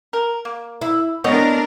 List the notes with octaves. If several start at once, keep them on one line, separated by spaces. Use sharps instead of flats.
A#4
A#3
E4
A3 B3 C4 D4 A#4 C#5 D#5